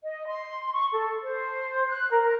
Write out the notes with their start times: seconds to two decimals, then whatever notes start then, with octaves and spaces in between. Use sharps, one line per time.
0.04 D#5
0.28 C6
0.73 C#6
0.92 A4
1.23 C5
1.88 F#6
2.10 A#4
2.23 A#4